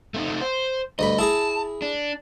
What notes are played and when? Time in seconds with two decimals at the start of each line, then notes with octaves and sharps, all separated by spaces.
0.14 A3 C4 D#4
0.41 C5
0.99 D2 G2 D#5 B5
1.19 E4 G#4 A5 A#5
1.82 D4